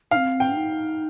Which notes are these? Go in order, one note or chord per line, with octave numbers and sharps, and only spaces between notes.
C4 D#4 F5
G5
D#4